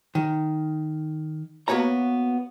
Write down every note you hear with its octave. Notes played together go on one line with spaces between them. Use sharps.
D#3
A#3 B3 F#4 C#5 A#5